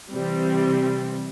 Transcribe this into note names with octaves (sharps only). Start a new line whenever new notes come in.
C3 E3 G3 C4